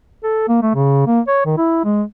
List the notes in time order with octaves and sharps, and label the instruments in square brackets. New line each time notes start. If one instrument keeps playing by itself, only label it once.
[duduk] A4
A#3
A3
C#3
A#3
C#5
D#3
E4
G#3